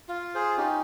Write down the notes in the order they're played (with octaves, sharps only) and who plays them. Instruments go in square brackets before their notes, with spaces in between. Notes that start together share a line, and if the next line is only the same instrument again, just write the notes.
[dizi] F4
[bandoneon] G#4 C5
C#4 D#4 G4